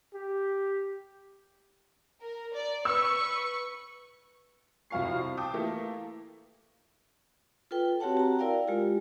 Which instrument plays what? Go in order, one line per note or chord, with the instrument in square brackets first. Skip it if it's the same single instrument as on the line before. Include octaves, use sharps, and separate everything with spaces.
[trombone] G4
[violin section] A#4
D5
[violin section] B4 C#6 [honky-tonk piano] E6
[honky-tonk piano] C2 F2 B2 F5 C#6 C7
G5 A5 D6 D#6
E3 A3 A#3 E4 F4
[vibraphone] F4 A4 B4 G5
C4 F#4 G4 C#5 F#5 A5
F#4 A#5
E4 A#4 D5 F5 G5
G#3 F4 G4